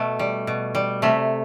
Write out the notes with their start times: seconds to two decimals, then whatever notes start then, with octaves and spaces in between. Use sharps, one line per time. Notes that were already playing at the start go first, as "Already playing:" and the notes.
Already playing: B2 A3
0.19 G3
0.47 B2
0.75 G3
1.02 C3 A3